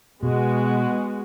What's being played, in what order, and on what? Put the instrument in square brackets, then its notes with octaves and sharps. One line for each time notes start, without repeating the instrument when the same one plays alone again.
[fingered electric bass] B2 [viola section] G#3 B3 F#4